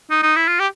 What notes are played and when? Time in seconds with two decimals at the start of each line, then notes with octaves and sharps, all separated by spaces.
0.10 D#4
0.23 D#4
0.36 E4
0.48 F4
0.60 G4